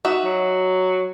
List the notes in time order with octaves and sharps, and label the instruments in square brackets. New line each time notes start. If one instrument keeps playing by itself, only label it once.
[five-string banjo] D#4 F#4 E5
[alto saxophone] F#3